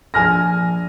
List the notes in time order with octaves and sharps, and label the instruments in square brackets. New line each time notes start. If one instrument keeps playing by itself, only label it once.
[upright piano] A#1 G#5 F6 A#6